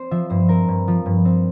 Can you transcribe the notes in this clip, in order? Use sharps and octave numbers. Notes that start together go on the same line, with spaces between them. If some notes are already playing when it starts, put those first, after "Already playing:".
Already playing: C4 C5
F3 E5
G2 C5
C4 A#4
G2
F3
G2
C4